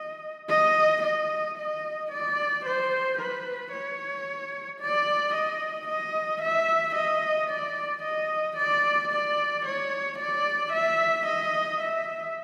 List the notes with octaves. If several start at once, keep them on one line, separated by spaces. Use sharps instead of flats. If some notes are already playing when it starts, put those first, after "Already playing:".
Already playing: D#5
D#5
D#5
D#5
D5
C5
B4
C#5
D5
D#5
D#5
E5
D#5
D5
D#5
D5
D5
C#5
D5
E5
D#5
E5